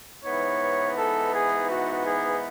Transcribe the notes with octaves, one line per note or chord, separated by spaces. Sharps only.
G#2 E3 B3 D#4 C#5
A4
G#4
F#4
G#4